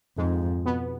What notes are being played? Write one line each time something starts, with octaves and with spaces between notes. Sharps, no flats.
F2 G#2 G#3
B2 B3